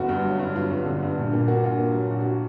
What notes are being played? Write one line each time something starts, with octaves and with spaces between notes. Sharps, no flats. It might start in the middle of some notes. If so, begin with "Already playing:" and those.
Already playing: G1 F#4
G2
F#3
G2
F#3 F4
G2
D3
G2
A#1
A#2
A#3 F#4
A#1 F4
A#3
F#3
A#1 F#4
F#4
F#4